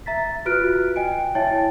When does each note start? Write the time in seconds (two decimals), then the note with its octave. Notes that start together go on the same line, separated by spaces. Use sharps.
0.06 E5 A#5 A6 B6
0.45 F4 F#4 B4 F6 F#6 D7
0.96 D#5 G5 G#5 D7
1.35 E4 C#5 E5 G5 A5 A6